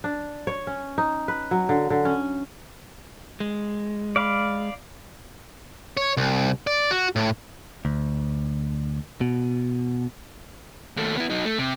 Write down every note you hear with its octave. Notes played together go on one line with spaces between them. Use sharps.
D4
C#5
C#4
D#4
B4
F#3
D3
D3
C#4
G#3
D5 F5 B5
C#5
C2
D5
F#4
A2
D2
B2
D#2 A3
B3 E4
F#3 D#4
A3
C3